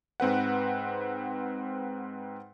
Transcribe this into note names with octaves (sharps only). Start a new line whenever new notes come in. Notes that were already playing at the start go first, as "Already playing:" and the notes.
G#2 C4 B4 F#5